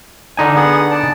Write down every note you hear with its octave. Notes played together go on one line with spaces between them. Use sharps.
D3 D#4 G#5
B3 G#4 F#5
D5 A5